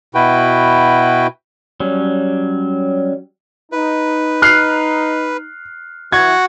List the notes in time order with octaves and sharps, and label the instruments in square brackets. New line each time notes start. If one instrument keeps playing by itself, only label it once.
[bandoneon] B2 E4 F#4 B4 G5
[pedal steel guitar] F#3 G3 C#4
[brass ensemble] D#4 [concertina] B4
[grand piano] F6 F#6 C7
[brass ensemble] E3 [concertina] F#4 F#5 [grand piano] G#6